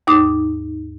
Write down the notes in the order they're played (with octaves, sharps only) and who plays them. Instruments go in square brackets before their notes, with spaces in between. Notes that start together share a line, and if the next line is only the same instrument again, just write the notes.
[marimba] D#2 G#2 D#4 D6 D#6